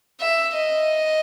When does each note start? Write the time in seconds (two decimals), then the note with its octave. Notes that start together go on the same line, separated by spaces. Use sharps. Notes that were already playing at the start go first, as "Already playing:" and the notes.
0.21 E5
0.55 D#5